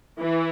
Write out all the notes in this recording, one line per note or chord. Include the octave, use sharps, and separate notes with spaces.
E3